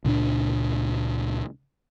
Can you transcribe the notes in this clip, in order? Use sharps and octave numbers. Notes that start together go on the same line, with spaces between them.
C#2 A#2 F3 D4